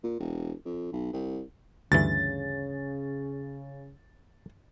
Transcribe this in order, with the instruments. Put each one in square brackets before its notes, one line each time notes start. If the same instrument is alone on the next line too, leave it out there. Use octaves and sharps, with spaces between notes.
[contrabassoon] A#2
E1
F2
B1
C2
[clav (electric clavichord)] D2 G2 E3 [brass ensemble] C#3 [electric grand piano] A6